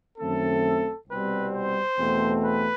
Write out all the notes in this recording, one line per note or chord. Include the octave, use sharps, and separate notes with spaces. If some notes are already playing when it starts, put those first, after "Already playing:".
F#2 D#3 A3 C4 A4
C2 B2 G3 C4 B4
C5
E2 B2 A3 C4
B4